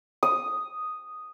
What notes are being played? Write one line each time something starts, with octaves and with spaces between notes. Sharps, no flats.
D#6